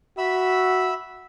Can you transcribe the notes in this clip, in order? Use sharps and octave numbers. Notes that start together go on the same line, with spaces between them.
F#4 E5 B5 E6